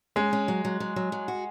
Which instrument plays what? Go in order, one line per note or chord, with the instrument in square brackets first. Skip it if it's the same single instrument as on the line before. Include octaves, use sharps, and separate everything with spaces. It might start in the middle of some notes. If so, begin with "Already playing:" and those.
[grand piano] G#3 [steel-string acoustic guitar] C#4
[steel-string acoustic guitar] C#4
F#3
F#3
F#3
F#3
F#3
F#4